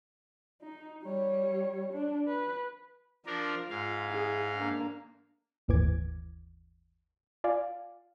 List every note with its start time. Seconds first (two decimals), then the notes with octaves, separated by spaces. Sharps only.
0.62 D#4
1.03 G3 C#5
1.93 D4
2.28 B4
3.26 F3 D4 F4 A#4
3.70 G#2 F5
4.09 E4 G#4
4.55 A#3 D4
5.68 G1 D#2 A2 E3 D6 G#6
7.44 F4 D5 F5 G#5